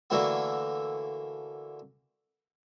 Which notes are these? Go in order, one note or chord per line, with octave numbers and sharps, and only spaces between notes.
D3 E3 A3 A#3 E4 F#4